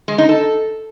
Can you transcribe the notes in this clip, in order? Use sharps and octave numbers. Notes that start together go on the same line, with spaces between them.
G#3
D#4
A4